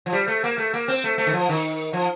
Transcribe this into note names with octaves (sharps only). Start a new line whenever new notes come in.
F3
G3
A3
A#3
A3
A#3
C4
A3
A3
D#3
F3
D#3
F3